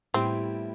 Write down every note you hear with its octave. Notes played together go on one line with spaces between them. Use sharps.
A2 G3 B3 C4 E4 G4